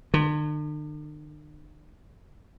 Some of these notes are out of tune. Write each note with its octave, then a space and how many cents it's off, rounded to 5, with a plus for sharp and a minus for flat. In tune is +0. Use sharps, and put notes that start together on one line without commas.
D3 +45